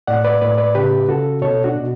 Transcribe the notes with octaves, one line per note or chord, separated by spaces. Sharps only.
A2 D5 F#5
B4 D5
A2 B4 D5
B4 D5
C#3 G4 B4
C#3 F#4 A4
B2 A4 C#5
D4 F#4
B2